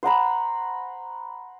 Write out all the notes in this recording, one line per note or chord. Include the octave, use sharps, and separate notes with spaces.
C5 F#5 A#5 B5